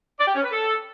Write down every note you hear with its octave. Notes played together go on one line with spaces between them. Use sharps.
D5
G4
C#4
B4
A4